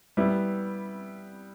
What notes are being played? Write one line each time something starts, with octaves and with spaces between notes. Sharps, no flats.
G3 B3 E4